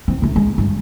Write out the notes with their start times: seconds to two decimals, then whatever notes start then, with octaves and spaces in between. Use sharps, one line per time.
0.08 F3 C4
0.22 D#1 A3
0.36 G#3
0.58 G2